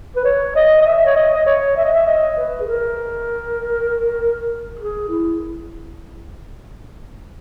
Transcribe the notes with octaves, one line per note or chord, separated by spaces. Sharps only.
B4
C#5
D#5
D#5
E5
C#5
D#5
D#5
C#5
E5
D#5
E5
D#5
B4
G#4
A#4
G#4
E4